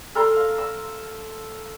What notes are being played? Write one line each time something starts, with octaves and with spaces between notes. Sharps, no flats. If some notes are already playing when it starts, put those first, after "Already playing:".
A4 A#4 A#5 C6
F5
E6